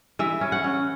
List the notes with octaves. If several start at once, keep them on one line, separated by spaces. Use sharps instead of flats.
E3 E5
C#4
F#5
C#4